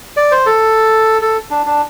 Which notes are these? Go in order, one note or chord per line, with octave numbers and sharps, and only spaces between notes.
D5
C5
A4
A4
D4
D4